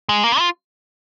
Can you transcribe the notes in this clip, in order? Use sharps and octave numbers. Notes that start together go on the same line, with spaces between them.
G#3
A#3
F4